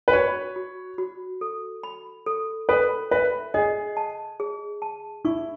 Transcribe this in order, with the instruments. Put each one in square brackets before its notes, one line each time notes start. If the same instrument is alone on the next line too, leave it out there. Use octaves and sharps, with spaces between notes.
[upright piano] B4
[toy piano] F#4 [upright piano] C#5
[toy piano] F#4
F#4
A4
B5
A4
[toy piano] A4 [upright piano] B4
[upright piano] B4 [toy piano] E5
[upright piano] G#4 [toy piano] D#5
[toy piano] A5
G#4
A5
[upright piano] E4 [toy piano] C#6